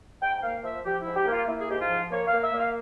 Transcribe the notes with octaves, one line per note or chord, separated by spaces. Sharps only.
G#2 G5
G5
A#3 F5
F3 E5
F3 G4
G#2 E4
G4
A#3
F4
A#3 E4
G#4
G#2 G4
F4
F3
A#3 C#5
F5
A#3
E5
A#3
F5